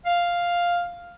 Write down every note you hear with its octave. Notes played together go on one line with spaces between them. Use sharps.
F5